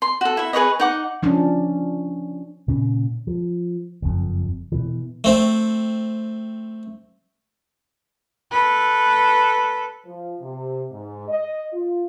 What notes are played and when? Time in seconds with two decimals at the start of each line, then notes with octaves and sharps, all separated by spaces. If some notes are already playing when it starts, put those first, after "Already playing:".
0.02 C6
0.21 F#4 A4
0.37 E4 E5
0.53 G#4 B4 C#5 D#5
0.80 D#4 F#5 D6
1.23 F3 C#4 D4
2.68 A#2 C#3 C#4
3.27 F3
4.02 F#1 F2
4.72 B2 E3
5.24 A3 C4
8.51 A4 B4
10.05 F3
10.40 C3
10.91 G#2
11.29 D#5
11.73 F4